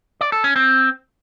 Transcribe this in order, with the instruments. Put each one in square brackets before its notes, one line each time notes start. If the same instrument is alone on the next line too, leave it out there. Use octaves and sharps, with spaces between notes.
[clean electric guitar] D5
A4
C#4
C4